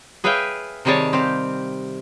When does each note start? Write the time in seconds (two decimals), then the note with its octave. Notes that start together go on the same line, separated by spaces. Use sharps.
0.24 G#4 B4 C#5 E5 F5 G5
0.85 C3 D#3 G3 G#4 C#5 A5
1.13 C4 G4 F5